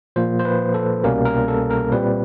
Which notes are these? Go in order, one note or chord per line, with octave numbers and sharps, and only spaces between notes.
A#2 F3 A#3 C5
C5
B4
A4
C2 B2 G3 A#3 C#4 A#4
A#4
A4
A#4
A#2 G3 C4 B4